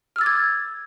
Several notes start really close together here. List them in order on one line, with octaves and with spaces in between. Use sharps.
F6 E6 A6 D6 G#6